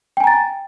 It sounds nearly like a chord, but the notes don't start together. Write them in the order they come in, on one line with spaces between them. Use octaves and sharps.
G5 G#5 A#5 A6